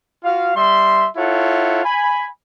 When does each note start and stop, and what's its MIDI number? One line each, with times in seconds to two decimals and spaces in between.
0.24 0.52 65
0.24 0.52 66
0.24 0.52 77
0.56 1.08 55
0.56 1.08 76
0.56 1.08 84
1.17 1.83 64
1.17 1.83 65
1.17 1.83 69
1.17 1.83 73
1.17 1.83 78
1.85 2.27 80
1.85 2.27 83